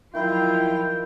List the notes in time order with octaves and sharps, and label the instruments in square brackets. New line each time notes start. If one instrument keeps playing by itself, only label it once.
[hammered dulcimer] D#3 [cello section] F3 F#3 F4 [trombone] E4 [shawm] G5